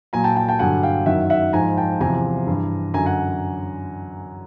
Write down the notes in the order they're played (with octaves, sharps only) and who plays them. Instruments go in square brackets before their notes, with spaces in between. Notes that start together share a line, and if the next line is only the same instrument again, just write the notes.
[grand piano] A#2 F#3 G#5 A#5
G5 A5
G5 A5
G5 A5
G2 D3 F#3 F#5 G#5
F5 G5
F#2 D#3 F#3 E5 F#5
E5 F#5
G#2 F3 G#5 A#5
G5 A5
E2 C3 F3 G#5 A#5
G2 E3
F#2 D3 F#3 G#5 A#5
F#5 G#5